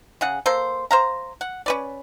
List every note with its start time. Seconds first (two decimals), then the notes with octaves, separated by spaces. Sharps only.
0.21 C#3 G#4 F#5
0.46 A#3 A4 C5
0.91 C5 F5 A#5
1.41 F#5
1.66 C#4 B4 D5